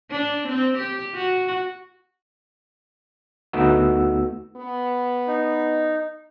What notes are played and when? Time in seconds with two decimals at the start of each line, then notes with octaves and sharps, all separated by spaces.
0.11 D4
0.48 C4
0.78 G4
1.15 F#4
3.53 D2 A3 B3 D#4 F#4 E6
4.57 B3
5.28 D#4